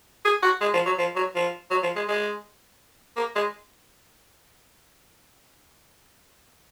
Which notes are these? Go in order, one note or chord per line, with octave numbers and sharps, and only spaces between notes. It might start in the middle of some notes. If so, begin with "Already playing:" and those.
G#4
F#4
G#3
F3
F#3
F3
F#3
F3
F#3
F3
G#3
G#3
A#3
G#3